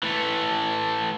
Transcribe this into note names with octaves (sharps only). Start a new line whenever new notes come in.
E3 A3